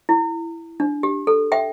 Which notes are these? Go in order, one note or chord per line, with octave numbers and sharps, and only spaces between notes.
E4
D4
G4
A4
E5 G5